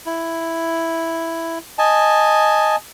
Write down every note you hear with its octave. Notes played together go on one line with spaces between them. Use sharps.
E4
D#5 G#5 A5